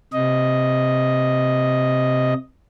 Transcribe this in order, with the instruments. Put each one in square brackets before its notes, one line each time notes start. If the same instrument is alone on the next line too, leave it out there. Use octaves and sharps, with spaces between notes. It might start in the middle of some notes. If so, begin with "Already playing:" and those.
[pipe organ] C3 D#5